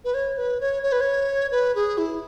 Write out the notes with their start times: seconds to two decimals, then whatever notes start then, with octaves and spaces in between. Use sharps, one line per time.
0.05 B4
0.14 C#5
0.38 B4
0.61 C#5
0.83 C#5
0.92 B4
1.01 C#5
1.52 B4
1.75 G#4
1.98 E4